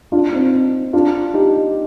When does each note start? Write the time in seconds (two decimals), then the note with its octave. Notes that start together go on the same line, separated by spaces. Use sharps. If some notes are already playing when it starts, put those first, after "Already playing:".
0.12 D4 F4
0.33 C4 D#4
0.93 D4 F4
1.34 D#4 G4